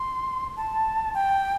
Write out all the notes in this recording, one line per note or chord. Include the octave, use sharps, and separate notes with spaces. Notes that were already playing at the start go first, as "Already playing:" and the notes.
Already playing: C6
A5
G5